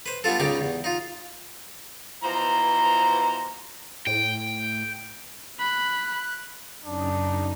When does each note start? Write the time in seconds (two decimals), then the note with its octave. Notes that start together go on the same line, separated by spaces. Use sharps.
0.06 B4 C5
0.24 G3 B3 D4 F4 A4
0.40 C#2 C#3 G3 D#4 G5 D6
0.61 E2
0.84 D#4 F4
2.23 B2 E3 F3 C5 A#5
4.07 A2 G5
5.59 B5 F#6
6.84 F#2 C#3 D4 D#4